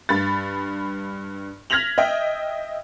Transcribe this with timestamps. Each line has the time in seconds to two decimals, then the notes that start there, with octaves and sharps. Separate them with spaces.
0.09 G2 B5 A6
1.70 F6 G#6 A#6 B6 F7 F#7
1.98 D#5 E5 G5